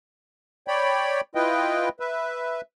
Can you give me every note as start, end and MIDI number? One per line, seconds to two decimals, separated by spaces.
0.68 1.21 73
0.68 1.21 74
0.68 1.21 79
0.68 1.21 83
1.35 1.89 64
1.35 1.89 65
1.35 1.89 71
1.35 1.89 75
1.35 1.89 79
2.00 2.61 71
2.00 2.61 76